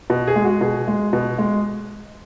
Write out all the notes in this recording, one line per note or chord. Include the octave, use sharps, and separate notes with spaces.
B2
G#4
G#3
F#4
B2 G#4
G#3
B2
G#3